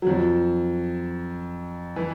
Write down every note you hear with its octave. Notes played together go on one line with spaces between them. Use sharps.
F#3
F2 F3
E3